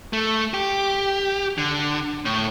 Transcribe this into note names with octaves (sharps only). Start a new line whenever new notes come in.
A3
G4
D3
A2